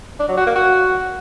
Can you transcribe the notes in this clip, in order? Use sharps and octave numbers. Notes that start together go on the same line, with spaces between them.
D4
F#3
F#4
A#3
F#4